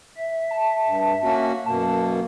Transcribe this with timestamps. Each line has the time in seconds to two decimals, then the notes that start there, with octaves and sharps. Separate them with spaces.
0.17 E5
0.51 A5
0.86 G2
1.24 A#3 C#4 F#4
1.66 F#2 B2 A#3 A5